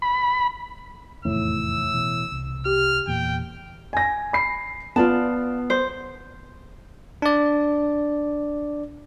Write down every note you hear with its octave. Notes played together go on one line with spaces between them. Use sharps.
B5
F1 E2 A2 D#3 E6
B2 E3
C2
G4 F6
E2 A#2 G5
G#5 A#6
B5 C7
B3 F4 D5 A5
C5
D4 D5